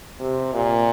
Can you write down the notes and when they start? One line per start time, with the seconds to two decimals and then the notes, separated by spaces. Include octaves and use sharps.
0.20 C3
0.54 A#2